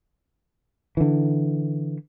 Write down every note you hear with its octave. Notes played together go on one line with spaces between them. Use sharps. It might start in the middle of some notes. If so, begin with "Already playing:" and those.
D3 E3